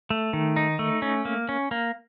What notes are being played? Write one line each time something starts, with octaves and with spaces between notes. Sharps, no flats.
A3
D#3
D#4
A3
C#4
A#3
C#4
A#3